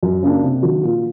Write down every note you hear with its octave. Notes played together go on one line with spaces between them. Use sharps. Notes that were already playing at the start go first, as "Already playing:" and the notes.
F#2
C#3 F#3 A#3 D4
C3
D#3 F#3
A#2